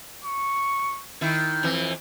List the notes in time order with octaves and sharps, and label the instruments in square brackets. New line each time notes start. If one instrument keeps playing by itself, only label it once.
[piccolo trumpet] C#6
[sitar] D#3 E4 [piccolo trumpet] G6
[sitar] F2 E3